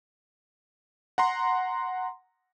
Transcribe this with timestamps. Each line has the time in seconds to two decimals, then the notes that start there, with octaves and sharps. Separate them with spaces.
1.18 F#5 A#5 C6